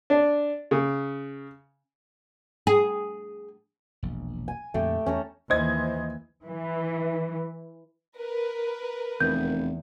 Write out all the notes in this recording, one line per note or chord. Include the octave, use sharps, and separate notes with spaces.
D4
C#3
G#4
E1 A#1
G#5
F2 A#2 D3 A3 G4
E2 C#4 A4 A#5
D#2 E3 C5 D#5 G#6
E3
A#4 B4
F1 E2 G6